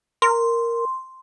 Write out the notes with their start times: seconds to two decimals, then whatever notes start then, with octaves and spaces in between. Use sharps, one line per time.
0.22 A#4 C6